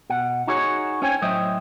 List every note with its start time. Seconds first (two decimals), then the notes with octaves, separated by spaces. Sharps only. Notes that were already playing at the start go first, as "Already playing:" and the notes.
0.10 B2 F#5
0.47 D#4 F#4 G#4 C#5
1.02 C#4 C5 C#5 G5 G#5
1.22 A2 F#3 C5 D#5 E5 G5